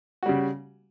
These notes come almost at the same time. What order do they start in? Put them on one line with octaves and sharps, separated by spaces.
F#4 G3 C#3